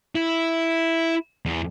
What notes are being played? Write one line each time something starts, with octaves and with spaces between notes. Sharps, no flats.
E4
E2